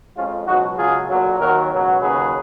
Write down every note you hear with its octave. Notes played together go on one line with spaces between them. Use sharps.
F2 F3 G#3 C#4 F4
C#2 B2 F#3 D#4 F#4
C#2 C#3 F#3 F4 G#4
B1 A#2 F#3
D#2 D#3 F#3 F#4 A#4
C#2 B2 F#3
D#2 C#3 F#3 G#4 B4